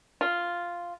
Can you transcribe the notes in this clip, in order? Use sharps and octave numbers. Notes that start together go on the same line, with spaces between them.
F4